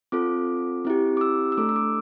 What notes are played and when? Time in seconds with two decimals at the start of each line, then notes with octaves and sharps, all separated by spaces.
0.12 C4 F4 A4 D6
0.85 C4 E4 G4
1.17 D6
1.21 E6
1.52 E6
1.58 A3 D4 A4 D6
1.69 E6
1.76 D6